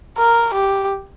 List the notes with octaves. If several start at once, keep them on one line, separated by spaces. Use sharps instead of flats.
A#4
G4